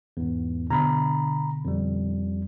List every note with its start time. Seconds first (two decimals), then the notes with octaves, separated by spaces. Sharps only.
0.17 E2 G#2
0.70 B2 D3 A#5 B5
1.65 F2 G3